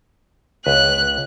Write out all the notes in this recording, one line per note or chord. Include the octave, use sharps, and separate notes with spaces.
C#2 B4 F#6